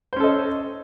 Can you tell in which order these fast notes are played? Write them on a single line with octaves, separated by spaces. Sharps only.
C5 C#4 A4 D#5